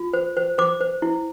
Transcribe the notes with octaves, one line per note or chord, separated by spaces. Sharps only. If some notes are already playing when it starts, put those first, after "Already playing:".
Already playing: F4
C5
C5
C5 D6
C5
E4